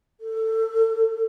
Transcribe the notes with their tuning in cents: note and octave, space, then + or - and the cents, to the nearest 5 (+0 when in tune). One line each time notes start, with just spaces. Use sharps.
A4 +20